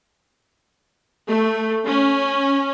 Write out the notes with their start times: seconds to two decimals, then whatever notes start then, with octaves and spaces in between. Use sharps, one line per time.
1.28 A3
1.86 C#4